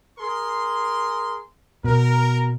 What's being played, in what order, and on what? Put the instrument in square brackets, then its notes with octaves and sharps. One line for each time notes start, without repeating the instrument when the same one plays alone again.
[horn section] G#4 A#4 C6
[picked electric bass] B2 [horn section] A#4